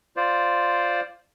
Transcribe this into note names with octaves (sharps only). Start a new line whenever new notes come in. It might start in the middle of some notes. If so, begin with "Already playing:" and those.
F4 C5 D5